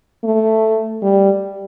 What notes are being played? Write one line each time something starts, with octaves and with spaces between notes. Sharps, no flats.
A3
G3